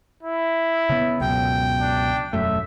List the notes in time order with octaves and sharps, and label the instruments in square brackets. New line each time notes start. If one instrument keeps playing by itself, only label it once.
[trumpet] E4
[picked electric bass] C#3 B3
[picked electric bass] C#2 F#2 B2 [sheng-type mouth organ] G5
[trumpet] D4
[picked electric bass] E1 F#2 A3 [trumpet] E5